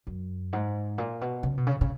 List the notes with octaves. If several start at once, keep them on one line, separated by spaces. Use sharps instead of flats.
F#2
G#2
A#2
B2
C#3
B2
C#3
C#3